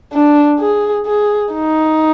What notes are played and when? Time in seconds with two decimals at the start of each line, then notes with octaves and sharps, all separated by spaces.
0.13 D4
0.60 G#4
1.06 G#4
1.54 D#4